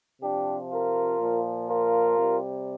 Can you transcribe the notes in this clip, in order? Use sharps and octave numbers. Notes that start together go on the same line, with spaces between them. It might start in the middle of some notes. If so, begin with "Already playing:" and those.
C3 F3 D4 G4
F4 A#4
A#2 F3
F4 A#4
C3 G3